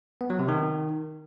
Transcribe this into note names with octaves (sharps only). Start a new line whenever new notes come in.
B3
F#3
C3
D#3